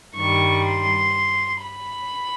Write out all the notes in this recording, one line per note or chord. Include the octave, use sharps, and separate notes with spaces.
G2 D#3 G3 C#6
C6
B5